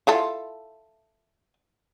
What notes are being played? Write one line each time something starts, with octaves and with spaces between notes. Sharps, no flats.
E4 F4 A4